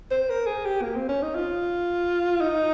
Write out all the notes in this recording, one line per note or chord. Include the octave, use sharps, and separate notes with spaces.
C5
A#4
G#4
G4
A#3
C4
C#4
D#4
F4
D#4